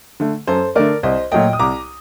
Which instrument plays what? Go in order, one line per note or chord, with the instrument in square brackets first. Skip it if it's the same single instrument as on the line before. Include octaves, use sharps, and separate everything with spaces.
[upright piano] D3 A3
F#2 A4 C5
D3 A3 A#4 D5
C2 C5 D#5
A#2 F#3 A3 D#5 G5
D#6
C2 A#5 D6